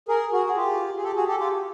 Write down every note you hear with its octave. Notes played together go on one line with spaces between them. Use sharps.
G#4 A#4
F#4 G#4
G#4
F4 G4
G#4
G4 A4
F#4 G#4
G4 A4
F4 G4